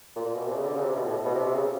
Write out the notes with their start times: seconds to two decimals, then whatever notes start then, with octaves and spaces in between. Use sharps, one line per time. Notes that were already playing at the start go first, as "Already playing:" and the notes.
0.16 A#2
0.26 A#2
0.36 B2
0.46 C3
0.56 C#3
0.65 D3
0.76 C#3
0.85 C3
0.96 B2
1.05 A2
1.26 B2
1.36 C3
1.46 C3
1.55 C#3